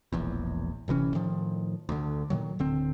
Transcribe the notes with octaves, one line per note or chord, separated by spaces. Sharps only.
E1 A#1 E2
D1 C3 E3 C#4
A2 D#3 F3
D2 D3
A#2 D#3 F#3
D1 D3 C4